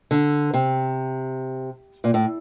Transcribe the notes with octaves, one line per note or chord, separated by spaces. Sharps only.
D3
C3
A#2
A2